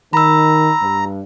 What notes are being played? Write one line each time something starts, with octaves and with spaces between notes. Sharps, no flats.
D#3 A#5 B5 E6
G2